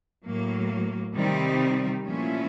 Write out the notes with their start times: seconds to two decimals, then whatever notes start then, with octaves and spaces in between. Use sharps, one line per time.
0.25 A2 F#3 A#3
1.15 C3 D#3 G3 C4 D#4
2.05 A#2 F3 A3 C#4 E4